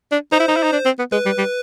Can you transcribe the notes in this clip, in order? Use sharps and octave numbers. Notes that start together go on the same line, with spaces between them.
D4
D#4 C5
E4
D#4
E4
D#4
D4
C4
B3
G#3 B4
G3
G3